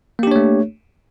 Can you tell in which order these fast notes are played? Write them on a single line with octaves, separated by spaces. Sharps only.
A#3 G4 D4 C#5 A3